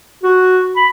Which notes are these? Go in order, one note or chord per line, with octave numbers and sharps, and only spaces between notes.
F#4
B5